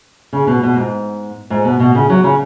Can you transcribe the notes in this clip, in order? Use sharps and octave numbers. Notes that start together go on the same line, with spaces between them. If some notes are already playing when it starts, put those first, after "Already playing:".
C#3
B2
B2
G#2
G#2
B2
B2
C#3
F#3
C#3